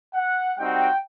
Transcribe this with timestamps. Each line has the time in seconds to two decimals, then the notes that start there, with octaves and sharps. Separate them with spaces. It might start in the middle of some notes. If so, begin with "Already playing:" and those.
0.15 F#5
0.58 G3 C4 D#4 F#4 G5